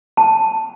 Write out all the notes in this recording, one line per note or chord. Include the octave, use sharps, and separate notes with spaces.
A5